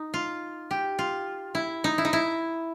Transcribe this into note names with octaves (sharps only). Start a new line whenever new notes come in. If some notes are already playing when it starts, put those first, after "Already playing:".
Already playing: D#4
F4
G4
F4
E4
D#4
E4
D#4
E4